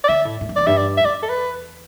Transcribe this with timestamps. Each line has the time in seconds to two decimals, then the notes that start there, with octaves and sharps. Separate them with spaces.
0.04 D5
0.09 D3 E5
0.25 A2
0.41 A2
0.49 G2
0.56 E2 D5
0.67 G2 E5
0.77 D5
0.97 E5
1.05 E2 D5
1.23 A4
1.29 B4